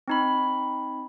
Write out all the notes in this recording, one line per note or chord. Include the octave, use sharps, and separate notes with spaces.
C4 D#4 B5